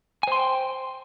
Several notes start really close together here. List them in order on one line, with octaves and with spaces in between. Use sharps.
G#5 C5 C6 G5